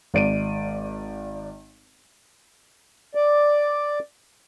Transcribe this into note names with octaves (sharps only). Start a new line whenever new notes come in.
G#1 D5 D7 D#7
D5